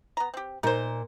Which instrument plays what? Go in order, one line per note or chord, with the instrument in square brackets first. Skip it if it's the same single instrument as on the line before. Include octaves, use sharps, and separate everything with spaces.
[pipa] B3 A#5
C4 G4
[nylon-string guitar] A#2 A#4 [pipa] D#4 C5